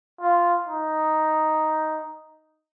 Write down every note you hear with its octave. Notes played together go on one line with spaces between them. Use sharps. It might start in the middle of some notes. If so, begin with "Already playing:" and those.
F4
D#4